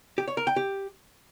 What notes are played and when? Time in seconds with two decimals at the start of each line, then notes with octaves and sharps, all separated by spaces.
0.18 G4
0.28 C#5
0.37 A#4
0.47 G5
0.56 G4